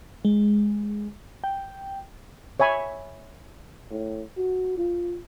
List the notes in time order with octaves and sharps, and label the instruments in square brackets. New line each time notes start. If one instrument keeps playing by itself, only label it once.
[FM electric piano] G#3
G5
[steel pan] C#5 E5 G#5 B5
[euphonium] A2
F#4
F4